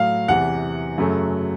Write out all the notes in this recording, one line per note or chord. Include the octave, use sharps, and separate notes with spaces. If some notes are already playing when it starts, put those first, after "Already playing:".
Already playing: A2 F#3 A3 F5
E2 C3 E3 F#5
F#2 C#3 F#3 A3